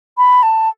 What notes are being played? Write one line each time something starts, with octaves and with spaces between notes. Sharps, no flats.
B5
A5